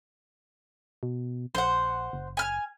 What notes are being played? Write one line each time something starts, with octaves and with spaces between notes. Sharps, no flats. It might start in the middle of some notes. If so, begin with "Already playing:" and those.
B2
A#1 C5 F#5
F#1
G#5 F6